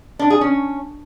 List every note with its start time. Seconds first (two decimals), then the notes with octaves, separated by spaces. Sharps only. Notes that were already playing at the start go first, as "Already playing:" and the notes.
0.19 D4
0.30 G#4
0.41 C#4